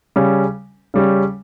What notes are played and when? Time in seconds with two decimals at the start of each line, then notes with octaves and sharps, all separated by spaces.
0.16 C#3 G3 C#4
0.94 C#3 G3 C#4